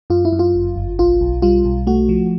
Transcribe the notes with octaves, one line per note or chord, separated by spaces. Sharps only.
F#2 F4
E4
F#2
F4
G1
G1
B1 F4
B1
G3 F4
B1
A3 F#4
F3